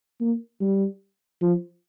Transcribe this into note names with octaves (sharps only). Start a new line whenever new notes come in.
A#3
G3
F3